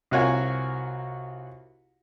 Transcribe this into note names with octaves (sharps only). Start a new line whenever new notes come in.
C2 F4 F#4 A#4 C#5 G#5